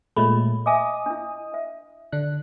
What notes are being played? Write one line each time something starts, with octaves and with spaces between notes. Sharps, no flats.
A#2 G#3 A3 C#5 B5
D#5 E5 G#5 D6 D#6
D4 E4
E5
D3 D4 F#6